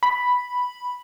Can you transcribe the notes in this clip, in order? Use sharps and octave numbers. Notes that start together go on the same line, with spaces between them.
B5